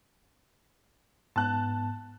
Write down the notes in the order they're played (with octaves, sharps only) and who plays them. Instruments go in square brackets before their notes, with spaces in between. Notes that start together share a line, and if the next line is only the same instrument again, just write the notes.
[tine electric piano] G#2 B3 [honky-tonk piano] A5 F#6